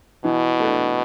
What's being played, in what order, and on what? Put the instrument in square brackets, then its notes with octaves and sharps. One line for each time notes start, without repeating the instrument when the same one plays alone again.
[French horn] B2 [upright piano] E3
[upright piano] A3 D4